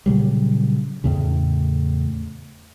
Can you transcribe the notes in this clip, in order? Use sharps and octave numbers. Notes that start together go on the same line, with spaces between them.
A#2 C#3 F#3 G3
E2 A2 C#3